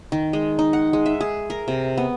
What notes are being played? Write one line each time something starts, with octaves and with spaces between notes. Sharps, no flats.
D#3
G#3
D#4
F#5
G#3
E5
G#4
A#4
C3
B3